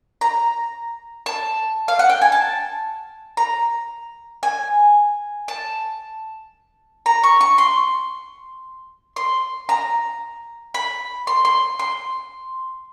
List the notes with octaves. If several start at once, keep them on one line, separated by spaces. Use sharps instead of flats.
A#5
A5
F5
F#5
G5
G#5
A5
A#5
G#5
A5
A#5
C#6
C#6
C6
C6
A#5
B5
C6
C6
C6